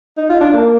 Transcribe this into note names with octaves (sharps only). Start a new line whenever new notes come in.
D#4
F4
D4
A#3